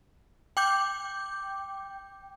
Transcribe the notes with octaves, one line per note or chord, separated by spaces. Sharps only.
G5 D6 G6